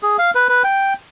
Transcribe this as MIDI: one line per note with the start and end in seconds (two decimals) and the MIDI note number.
0.03 0.17 68
0.19 0.31 77
0.35 0.48 71
0.49 0.63 71
0.64 0.94 79